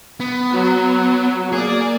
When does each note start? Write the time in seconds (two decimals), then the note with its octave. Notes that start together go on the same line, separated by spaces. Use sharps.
0.20 B3
0.53 F#3
1.52 A#3 G#4 D5